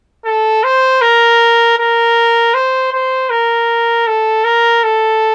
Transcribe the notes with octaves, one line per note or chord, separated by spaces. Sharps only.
A4
C5
A#4
A#4
C5
C5
A#4
A4
A#4
A4